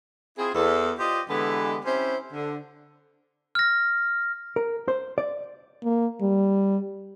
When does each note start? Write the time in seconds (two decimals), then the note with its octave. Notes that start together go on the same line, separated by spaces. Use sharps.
0.38 C4 E4 F4 G#4
0.55 E2 A4
0.99 F4 G4 C5 D5 D#5
1.30 D3 E3 G#3 B3 G4 A4
1.85 C4 C#4 E4 G4 C5
2.33 D3
3.55 F6 A#6
4.56 A#4
4.88 C5
5.18 D5
5.84 A#3
6.21 G3